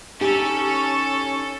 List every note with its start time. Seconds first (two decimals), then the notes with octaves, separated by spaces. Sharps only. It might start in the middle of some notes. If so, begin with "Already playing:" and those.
0.21 C#4 D#4 G4 A4